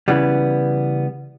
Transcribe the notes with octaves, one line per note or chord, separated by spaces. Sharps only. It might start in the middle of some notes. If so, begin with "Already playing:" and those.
C#3 E3 G3 B3